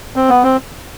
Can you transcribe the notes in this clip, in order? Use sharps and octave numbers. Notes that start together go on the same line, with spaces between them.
C4
B3
C4